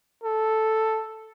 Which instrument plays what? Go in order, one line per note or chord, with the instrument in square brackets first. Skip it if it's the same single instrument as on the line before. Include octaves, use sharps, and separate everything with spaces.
[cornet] A4